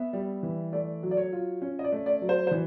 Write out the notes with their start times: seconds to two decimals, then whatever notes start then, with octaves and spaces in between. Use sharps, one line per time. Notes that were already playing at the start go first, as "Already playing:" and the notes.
Already playing: B3 E5
0.13 G3
0.43 E3
0.73 A3 D5
1.03 F#3
1.11 D5
1.17 C#5
1.33 F4
1.62 C#4
1.79 D#5
1.84 D5
1.92 A3
2.06 D5
2.22 F#3
2.29 C5
2.47 C5
2.51 E3